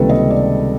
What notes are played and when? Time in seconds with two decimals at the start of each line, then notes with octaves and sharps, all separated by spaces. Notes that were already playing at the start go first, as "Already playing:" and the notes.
Already playing: C#2 C3 D#3 G3 A#3 A4 B4
0.09 D#5
0.30 D5